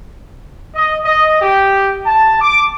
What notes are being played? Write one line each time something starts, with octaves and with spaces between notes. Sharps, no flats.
D#5
D#5
G4
A5
D6